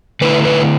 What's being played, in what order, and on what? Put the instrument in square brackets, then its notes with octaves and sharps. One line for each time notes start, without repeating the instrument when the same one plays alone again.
[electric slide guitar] D3 A3 E4 B4
B4